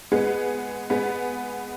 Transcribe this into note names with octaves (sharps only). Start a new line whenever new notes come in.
G#3 B3
G#3 B3